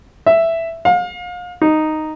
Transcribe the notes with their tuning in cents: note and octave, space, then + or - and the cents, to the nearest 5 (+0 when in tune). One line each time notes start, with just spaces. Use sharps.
E5 +5
F5 +35
D#4 -5